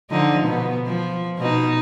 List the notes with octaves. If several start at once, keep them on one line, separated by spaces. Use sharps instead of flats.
D3 F3 D#4
B2 B3
F3
B2 D#4